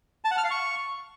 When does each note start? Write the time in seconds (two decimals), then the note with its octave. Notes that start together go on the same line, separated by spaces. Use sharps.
0.25 A5
0.31 F#5
0.38 F6
0.44 F5
0.51 C#6